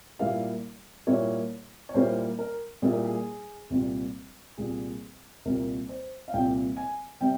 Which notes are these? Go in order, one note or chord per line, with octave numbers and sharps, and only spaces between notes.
A#2 G3 A#3 E4 F5
A#2 G3 A#3 E4 C#5
C#5
A#2 G3 A#3 E4 C5
A#4
A#2 G3 A#3 E4 G#4
A#4
G#4
C2 A#2 G3
C2 A#2 G3 G#4
C2 A#2 G3 A#4
C5
F5
C2 A#2 G3 G5
G#5
C3 G3 G5